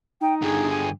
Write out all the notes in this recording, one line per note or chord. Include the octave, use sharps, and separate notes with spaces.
D#4 G5
G2 D3 G#4
G#5